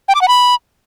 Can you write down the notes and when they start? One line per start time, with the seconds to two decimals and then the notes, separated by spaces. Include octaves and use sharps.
0.08 G5
0.15 D6
0.21 F#5
0.28 B5